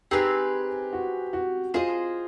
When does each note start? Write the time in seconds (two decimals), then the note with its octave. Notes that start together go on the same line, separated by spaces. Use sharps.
0.11 C4 D#4 G4 G#4 B4
0.93 F#4
1.33 F#4
1.74 F4 G#4 C5 D#5